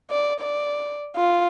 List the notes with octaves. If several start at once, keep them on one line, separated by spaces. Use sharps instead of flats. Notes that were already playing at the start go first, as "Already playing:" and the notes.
D5
D5
F4